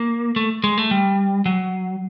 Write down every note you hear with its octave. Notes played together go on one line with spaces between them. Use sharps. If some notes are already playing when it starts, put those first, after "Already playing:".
Already playing: A#3
A3
G#3
A3
G3
F#3